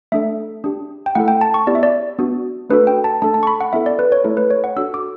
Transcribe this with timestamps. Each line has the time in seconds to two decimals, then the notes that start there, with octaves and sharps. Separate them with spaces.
0.12 A3 D4 A4 E5
0.64 D4 G4
1.06 G5
1.15 A3 E4 A4 F#5
1.28 G5
1.41 A5
1.54 C#6
1.67 B3 E4 G4 D5
1.75 E5
1.83 D5
2.19 B3 D4 F#4
2.69 A3 D4 F#4 A4 B4
2.87 G5
3.04 A5
3.22 A3 D4 A4 A5
3.34 A5
3.43 C#6
3.47 B5
3.61 F#5
3.73 B3 E4 A4 E5
3.86 D5
3.99 B4
4.12 C#5
4.24 A3 E4 A4
4.37 B4
4.50 C#5
4.64 F#5
4.76 D4 F#4 A4 E6
4.94 D6